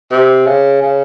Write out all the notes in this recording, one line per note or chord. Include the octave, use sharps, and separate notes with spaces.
C3
C#3
C#3